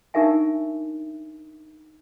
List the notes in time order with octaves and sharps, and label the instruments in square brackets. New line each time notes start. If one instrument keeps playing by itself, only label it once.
[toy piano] D4 D#4 G4 A#4 E5 G#5